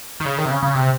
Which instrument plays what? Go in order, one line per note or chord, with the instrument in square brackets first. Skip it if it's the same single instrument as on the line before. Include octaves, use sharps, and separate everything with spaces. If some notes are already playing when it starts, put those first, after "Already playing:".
[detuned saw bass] D#3
C#3
D#3
C3
C#3
C#3
C3